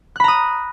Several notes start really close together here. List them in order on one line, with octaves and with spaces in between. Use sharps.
F#6 B5 A#5 D#6